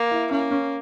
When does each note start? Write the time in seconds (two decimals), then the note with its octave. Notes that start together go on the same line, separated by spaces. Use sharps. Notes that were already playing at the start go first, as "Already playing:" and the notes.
Already playing: A#3
0.11 E4
0.31 A#3 C#4
0.51 C#4